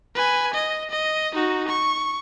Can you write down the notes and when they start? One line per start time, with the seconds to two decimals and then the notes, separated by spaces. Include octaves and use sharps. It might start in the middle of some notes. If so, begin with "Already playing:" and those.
0.15 B4 G#5
0.54 D#5
0.91 D#5
1.34 D#4 F#4
1.68 C#6